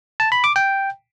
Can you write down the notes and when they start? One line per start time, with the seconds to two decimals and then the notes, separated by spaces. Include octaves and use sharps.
0.20 A5
0.32 B5
0.44 D6
0.56 G5